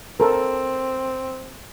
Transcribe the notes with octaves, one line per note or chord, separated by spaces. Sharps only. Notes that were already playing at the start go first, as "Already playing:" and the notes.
C4 A4 A#4